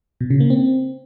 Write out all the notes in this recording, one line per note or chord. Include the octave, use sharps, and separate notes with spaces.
B2
C#3
A#3
C4